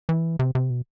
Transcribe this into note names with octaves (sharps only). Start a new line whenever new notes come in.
E3
C3
C3
B2